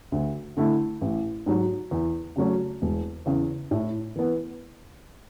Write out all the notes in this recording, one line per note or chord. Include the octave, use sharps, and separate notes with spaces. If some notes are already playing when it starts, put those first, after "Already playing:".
D2
D3 A3 E4
A1
G#2 F#3
E2
C#3 F#3 A3 C#4
E1
E2 C#3
A2
E3 B3